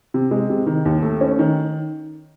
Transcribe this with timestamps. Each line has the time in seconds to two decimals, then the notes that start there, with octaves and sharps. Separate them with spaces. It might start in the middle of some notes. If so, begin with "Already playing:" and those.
0.14 C3
0.31 G#3
0.50 C3
0.66 D#3
0.85 D#2
1.02 A3
1.21 C#4
1.39 D#3